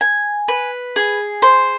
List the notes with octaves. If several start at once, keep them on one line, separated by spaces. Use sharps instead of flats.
G#5
B4
G#4
C5